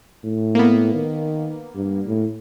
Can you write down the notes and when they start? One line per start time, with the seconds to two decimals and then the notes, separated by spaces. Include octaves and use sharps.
0.24 A2
0.55 A#3 B3
0.95 D#3
1.75 G2
2.07 A2